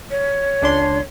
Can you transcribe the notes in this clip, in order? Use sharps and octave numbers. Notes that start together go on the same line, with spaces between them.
C#5
C#2 D4 C6